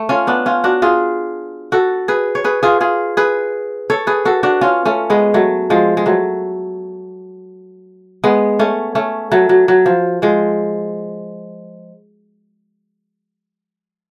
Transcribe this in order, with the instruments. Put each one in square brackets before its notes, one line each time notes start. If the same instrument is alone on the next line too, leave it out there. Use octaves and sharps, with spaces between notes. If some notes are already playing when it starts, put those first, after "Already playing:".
Already playing: [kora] A3
C#4 F4
B3 D4
C#4 F4
D4 F#4
F4 G#4
F#4 A4
G#4 B4
C#5
G#4 B4
F4 G#4
F4 G#4
G#4 B4
A4 C#5
G#4 B4
F#4 A4
D4 F#4
C#4 F4
A3 C#4
G#3 B3
F#3 A3
F3 G#3
G#3
F#3 A3
G#3 B3
A3 C#4
A3 C#4
F#3 A3
F#3
F#3
F3
F3 G#3